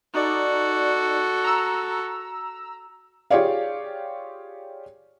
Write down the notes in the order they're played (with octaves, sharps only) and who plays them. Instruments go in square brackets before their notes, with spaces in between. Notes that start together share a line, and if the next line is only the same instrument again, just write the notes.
[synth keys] D#4 D5 [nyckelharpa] F#4 A4
[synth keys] A#5 E6
[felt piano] F4 G4 G#4 C#5 D5 F5